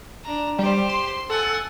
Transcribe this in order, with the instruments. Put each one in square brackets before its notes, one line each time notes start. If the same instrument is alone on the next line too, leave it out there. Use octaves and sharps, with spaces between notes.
[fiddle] D4 A#5
[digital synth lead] G3 [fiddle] G4 C5
[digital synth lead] C6
[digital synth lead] A4 [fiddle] F#5 G#5